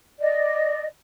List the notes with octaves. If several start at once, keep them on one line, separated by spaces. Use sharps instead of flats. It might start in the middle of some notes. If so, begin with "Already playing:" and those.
D5 D#5